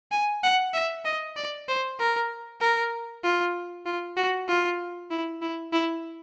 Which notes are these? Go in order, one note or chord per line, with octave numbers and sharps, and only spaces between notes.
G#5
F#5
E5
D#5
D5
C5
A#4
A#4
F4
F4
F#4
F4
E4
E4
E4